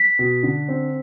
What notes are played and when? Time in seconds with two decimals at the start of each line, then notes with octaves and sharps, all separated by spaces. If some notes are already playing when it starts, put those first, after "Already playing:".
Already playing: B6
0.19 B2
0.43 D3
0.68 C4